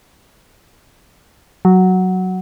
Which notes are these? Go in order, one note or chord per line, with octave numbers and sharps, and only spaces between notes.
F#3